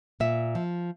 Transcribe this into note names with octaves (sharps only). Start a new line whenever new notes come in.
A#2 E5
F3